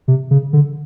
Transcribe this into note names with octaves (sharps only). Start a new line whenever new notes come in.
C3
C#3
D3